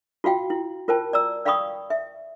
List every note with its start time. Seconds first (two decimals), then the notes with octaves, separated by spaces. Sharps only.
0.24 F4 F#4 F5 G5
0.50 E4
0.88 F4 A#4 C5 G5 A5
1.13 D5 A#5 E6
1.45 D5 F5 G5 B5 C#6 D#6
1.90 E5